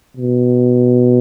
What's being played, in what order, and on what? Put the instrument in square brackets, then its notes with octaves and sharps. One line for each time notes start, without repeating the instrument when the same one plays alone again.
[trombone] B2